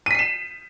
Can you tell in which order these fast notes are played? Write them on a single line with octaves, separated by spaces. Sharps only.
D#7 B6 C7 E7